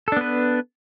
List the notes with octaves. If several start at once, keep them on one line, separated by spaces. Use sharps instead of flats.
B3 D4 A4 B4